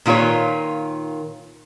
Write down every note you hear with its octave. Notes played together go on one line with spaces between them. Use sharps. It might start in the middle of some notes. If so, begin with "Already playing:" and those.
A#2 D#3 F4 B4 C#5